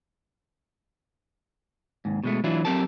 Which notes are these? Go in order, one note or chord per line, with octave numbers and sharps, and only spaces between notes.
D#2 G#2
B2 G#3 A3
E3 F#3 D4 E4 F4
F#3 C4 G4 A4 A#4 A5